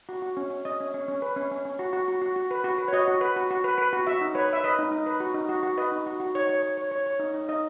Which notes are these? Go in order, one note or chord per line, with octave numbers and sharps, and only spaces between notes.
F#4
F#4
C#4
C#4
C#4 D#5
C#4
C#4
C#4
B4
C#4
C#4
C#4
F#4
F#4
F#4
F#4
F#4
B4
F#4
B4
C#5
F#4 D#5
F#4
B4
F#4
F#4
B4
B4
F#4
F#4 E5
D#4
B4 C#5
B4 E5
B4 D#5
D#4
D#4
B4
F#4
D#4
F#4
F#4
B4 D#5
D#4
F#4
F#4
D#4 C#5
C#5
C#5
C#5
C#5
C#5
D#4
D#4
D#4 D#5